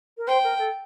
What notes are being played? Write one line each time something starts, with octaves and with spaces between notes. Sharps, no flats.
A#4
C5 G5
A#4
A4